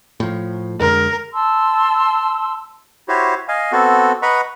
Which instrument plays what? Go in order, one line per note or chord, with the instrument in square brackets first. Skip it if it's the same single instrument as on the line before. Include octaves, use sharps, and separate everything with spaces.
[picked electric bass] A2 F3
[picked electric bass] F2 D3 G#3 [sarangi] A#4
[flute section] A5 C6 E6
[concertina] E4 F#4 G4 C5 C#5
D#5 F5 G#5
B3 C4 F#4 A4
B4 D#5 F#5 A#5 B5 C#6